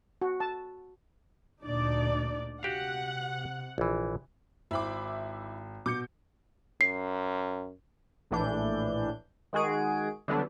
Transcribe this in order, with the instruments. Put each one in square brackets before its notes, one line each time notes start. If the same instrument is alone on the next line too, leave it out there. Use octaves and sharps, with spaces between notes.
[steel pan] F#4
A5
[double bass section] D2 A#2 [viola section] D4 D#4 D5
[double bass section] C3 [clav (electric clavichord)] F#4 G4 F5 [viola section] F#5
[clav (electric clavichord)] A#1 E3
[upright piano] G#1 C5 [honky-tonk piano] E4 B5 D6
[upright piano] B2 [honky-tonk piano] D6 G6 C#7
[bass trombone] F#2 [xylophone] C7
[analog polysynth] A#1 A2 E3 D4 G6
D#3 G#3 F#4 G#4 D7
D3 E3 F#3 G3 B3 D4